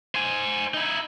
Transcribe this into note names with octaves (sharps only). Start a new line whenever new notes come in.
C5 G#5
D#4 E4